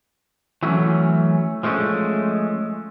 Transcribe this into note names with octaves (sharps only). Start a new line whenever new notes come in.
E3 F#3 A3 C#4
F3 G#3 A3 C#4